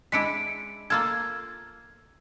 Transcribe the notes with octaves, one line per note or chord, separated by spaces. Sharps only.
G#3 D4 E4 B6 C#7 D7
A#3 F4 A4 E6 F6 G#6